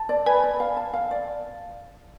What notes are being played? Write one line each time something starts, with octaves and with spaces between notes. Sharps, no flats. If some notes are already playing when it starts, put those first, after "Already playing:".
Already playing: A5
D5
B4 G#5 B5
D5
F5
A5
F5
D5